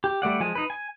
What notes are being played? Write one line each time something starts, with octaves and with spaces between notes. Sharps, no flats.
G4
G3 A3 D5 F#5
F3 G#3 G#5
D#4 B4
G#5